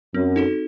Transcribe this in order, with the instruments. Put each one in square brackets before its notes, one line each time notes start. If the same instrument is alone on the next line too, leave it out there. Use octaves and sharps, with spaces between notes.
[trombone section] F#2 [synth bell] C4
[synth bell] D#4 F#4 A4